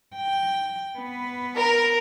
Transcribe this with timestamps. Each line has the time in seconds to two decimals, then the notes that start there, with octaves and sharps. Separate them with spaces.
0.16 G5
0.98 B3 B4
1.58 A#4